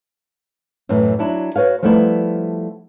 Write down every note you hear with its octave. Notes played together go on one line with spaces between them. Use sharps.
F#2 A2 E3
F#3 D4 E4
F#4 B4 C#5 F5
F3 G3 A3 B3 E4